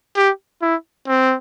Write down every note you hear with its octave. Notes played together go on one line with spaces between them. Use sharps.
G4
E4
C4